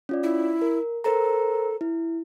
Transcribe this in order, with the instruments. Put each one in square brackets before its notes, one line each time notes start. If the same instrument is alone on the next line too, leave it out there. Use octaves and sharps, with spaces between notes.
[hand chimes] C#4 F4 D5
[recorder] E4
[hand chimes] A#4
[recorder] A4 [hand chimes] A#4 C5 A#5
[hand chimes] E4